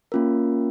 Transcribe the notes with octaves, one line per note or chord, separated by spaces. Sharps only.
A#3 C#4 F4 A#4